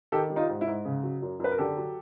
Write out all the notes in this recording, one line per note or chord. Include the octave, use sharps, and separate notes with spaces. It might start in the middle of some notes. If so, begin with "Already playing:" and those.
D#3 G4 A4
G3
D#4 F4
G#2
E4
G#2
C#3
F#3
F#2
F#2 B4
A#4
D3 G4 A4
F#3